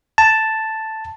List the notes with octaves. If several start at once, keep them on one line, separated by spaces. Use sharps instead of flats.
A5